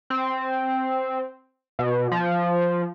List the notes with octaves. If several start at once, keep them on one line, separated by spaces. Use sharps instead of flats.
C4
B2
F3